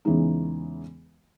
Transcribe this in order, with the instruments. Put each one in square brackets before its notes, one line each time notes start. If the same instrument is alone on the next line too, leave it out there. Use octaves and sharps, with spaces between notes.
[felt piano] E2 C#3 E3 G#3 D#4